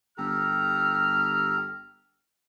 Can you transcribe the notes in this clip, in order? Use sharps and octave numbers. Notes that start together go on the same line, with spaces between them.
G1 G4 A4 A#5 F6